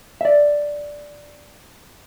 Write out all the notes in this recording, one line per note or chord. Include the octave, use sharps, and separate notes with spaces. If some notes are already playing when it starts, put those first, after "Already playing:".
D5 E5